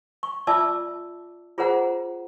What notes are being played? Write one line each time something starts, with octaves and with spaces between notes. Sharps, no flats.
C#6
F4 D5 E5 A5 D6 E6
F4 G#4 A#4 C5 F#5 A#5